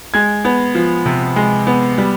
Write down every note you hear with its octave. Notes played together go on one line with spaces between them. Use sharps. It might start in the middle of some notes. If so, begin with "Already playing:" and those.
G#3 G#6
B3
F3
C3
G#3
B3
G3